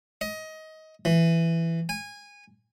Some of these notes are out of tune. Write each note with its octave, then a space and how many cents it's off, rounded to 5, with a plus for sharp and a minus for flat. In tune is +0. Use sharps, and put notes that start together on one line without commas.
D#5 +20
E3 +10
G#5 -20